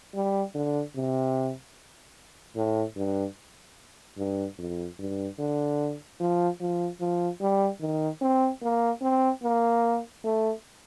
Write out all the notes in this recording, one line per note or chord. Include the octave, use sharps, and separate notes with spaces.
G3
D3
C3
A2
G2
G2
F2
G2
D3
F3
F3
F3
G3
D#3
C4
A#3
C4
A#3
A3